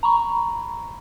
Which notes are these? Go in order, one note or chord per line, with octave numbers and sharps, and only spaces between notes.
A#5 B5 C#6